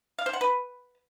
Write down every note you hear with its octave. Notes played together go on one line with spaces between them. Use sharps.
F5
C5
F#5
B4